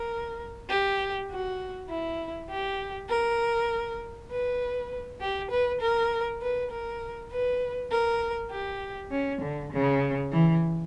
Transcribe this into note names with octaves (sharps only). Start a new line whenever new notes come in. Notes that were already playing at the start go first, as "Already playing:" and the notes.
Already playing: A#4
G4
F#4
E4
G4
A#4
B4
G4
B4
A#4
B4
A#4
B4
A#4
G4
C#4
D3
C#3
E3